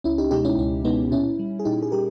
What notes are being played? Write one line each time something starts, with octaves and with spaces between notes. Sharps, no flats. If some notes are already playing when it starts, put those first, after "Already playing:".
C#2 C#4 E4
D#4 G4
B2 G#3 D#4 G4
C#4 E4
C#2 C#4
B2 G#3 B3 D#4
A#2 C#4 E4
G3
G#4
A#2 D#4 G4
G#4
G3 G4 A#4